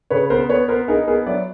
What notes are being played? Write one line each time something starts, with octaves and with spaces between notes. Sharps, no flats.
C#3 B4 C#5
B3 A#4 C5
B3 B4 C#5
B3 A#4 C5
D#4 G#4 A#4
B3 G#4 A#4
F#3 D5 E5